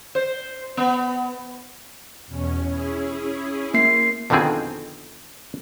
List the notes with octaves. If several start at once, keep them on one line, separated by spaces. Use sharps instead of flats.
C5
B3
E2 B2 C#4
C#4 E4 G#4
A#3 C7
F2 B2 D3 D#3 C4 G#4